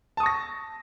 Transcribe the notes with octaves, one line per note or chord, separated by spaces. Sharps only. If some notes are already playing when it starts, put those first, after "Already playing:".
A5 C#6 D#6 A#6